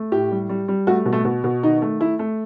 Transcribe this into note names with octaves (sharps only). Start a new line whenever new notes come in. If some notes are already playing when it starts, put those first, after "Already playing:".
Already playing: A3
A2 G4
G3
G3
G3
A3 F#4
B2
A3
B2
B2
D#3 D#4
A3
A3 E4
A3